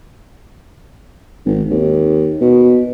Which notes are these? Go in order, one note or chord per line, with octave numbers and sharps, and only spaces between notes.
G#1
D#2
B2